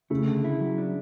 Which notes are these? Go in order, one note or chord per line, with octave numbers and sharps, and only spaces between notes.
C#3 A3
D3
E4
F#3
D4